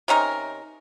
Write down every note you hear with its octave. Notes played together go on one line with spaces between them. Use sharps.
C3 C#4 D#4 A#4